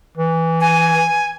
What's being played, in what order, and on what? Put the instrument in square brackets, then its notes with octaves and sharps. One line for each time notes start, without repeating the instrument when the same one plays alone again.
[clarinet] E3
[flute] G#5